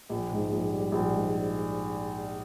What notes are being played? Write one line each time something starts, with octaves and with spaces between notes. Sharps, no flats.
A#1
G#2
A#1
G3
A#1
G#2